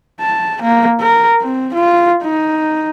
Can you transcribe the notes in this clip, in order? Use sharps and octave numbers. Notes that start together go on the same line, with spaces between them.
A5
A#3
A#4
C4
F4
D#4